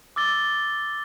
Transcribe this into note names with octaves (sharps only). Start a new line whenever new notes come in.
D6 E6 A6 G7